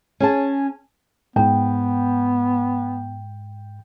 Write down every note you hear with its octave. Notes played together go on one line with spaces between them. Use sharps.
C#4 G#4 A5
G#2 B3 G5